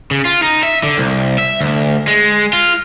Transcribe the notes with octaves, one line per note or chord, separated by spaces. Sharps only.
C#3
F4
D#4
E5
D3
C2
E5
D2
G#3
F4